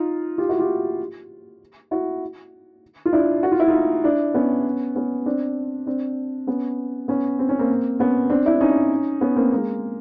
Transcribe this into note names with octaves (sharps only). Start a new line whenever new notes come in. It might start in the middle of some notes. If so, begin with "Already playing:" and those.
Already playing: D#4 F4
F4 G4
E4 F#4
F4 G4
E4 F#4
F4
D4 E4
F#4
F4
E4
D#4 F4
D4 E4
B3 C#4
B3 C#4
C4 D4
C4 D4
B3 C#4
B3 C#4
C4
C#4
A#3 C4
B3 C#4
C4 D4
D4 E4
C#4 D#4
B3 C#4
A#3 C4
G#3 A#3